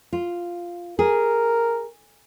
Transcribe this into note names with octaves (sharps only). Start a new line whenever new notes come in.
F4
G#4 A#4